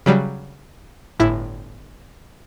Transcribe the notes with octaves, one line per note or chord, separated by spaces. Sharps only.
C#3 F#3 G3
G1 A2 E4